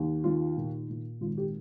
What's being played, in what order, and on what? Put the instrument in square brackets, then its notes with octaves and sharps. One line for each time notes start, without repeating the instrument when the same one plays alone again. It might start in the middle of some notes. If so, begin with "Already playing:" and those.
Already playing: [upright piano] D#2
D#3 F4
A#2
A#2
G#1 F4
G4